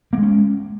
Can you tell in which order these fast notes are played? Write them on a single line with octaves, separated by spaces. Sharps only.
A#3 G#3 C#4